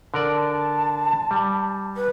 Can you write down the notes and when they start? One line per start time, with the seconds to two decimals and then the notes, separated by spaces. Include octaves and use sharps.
0.14 D3 A#4 D5 A5
1.31 G3
1.96 B4